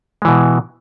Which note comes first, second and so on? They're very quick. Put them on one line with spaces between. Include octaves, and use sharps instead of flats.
G#3 E3 B2